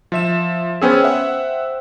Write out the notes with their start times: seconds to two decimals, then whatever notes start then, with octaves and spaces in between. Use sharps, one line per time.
0.12 F3 E5 E7
0.81 B3 C#4 G#4 C5 G5 E6
1.04 E5 F#5